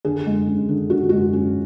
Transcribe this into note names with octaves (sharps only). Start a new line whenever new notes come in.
D3 G#4
G#3
C#4
D3
D3 F#4
G#3 F#4
C#4